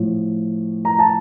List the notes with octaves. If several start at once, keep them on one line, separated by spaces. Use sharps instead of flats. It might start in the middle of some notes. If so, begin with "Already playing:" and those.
Already playing: A2 F3
A#5
A5